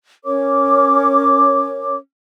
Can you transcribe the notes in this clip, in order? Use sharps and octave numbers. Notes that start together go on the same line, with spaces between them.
C#4 A#4 C#5 D6